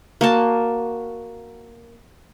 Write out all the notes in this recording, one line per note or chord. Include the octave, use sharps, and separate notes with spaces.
A#3 F#4 A5